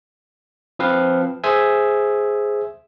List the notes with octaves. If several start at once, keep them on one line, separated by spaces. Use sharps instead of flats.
F3 C4 B4 F5
G#4 C5 E5 G#5